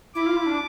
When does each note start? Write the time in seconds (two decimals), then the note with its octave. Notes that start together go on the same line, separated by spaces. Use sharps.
0.15 E4 D6
0.26 F4
0.36 E4
0.46 D4